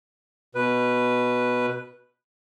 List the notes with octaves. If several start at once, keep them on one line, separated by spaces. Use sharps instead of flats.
B2 B4